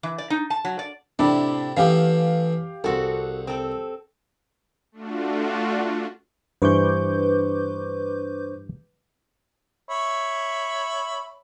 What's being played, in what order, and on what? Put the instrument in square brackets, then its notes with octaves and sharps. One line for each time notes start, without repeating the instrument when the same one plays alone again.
[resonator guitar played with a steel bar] E3
D5
D#4
A5
F#3
D5
[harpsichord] A2 C3 [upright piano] D4 [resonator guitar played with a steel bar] E4
[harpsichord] E3 A3 B3 [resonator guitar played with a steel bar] C#4 [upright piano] G4 F5
[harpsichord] C2 [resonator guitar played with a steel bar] C4 F#4 A4
[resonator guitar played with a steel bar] C4 A4
[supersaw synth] A3 D4 F4 F#4
[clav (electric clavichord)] G2 E3 [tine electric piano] D4 C5 C#6 [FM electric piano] B4 D6 G6
[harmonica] C#5 E5 B5